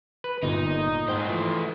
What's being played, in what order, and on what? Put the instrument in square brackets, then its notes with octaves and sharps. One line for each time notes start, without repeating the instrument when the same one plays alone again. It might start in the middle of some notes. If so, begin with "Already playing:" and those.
[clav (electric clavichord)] B4
[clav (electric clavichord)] G1 A#2 [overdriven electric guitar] D#4
[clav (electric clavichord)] G#2 G5 [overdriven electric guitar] A3 C5
[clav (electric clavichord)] E3 F3